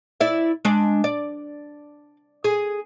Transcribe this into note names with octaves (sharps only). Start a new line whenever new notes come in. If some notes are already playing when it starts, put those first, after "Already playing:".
E4 D5 E5
G#3 D4
D5
G#4